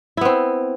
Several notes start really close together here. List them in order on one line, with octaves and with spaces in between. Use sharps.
E4 B3 C4